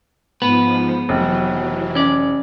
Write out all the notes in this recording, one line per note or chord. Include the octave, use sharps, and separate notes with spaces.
G#2 F3 B3 B4
F1 E3 F#3
C#4 D5